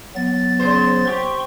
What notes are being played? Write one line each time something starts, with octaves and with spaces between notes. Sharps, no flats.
F#3 B3 A6
C#3 C5
G4 C6 C#6